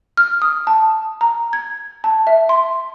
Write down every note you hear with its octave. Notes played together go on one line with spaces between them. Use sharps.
F6
D#6
A5
A#5
G#6
A5
E5
C6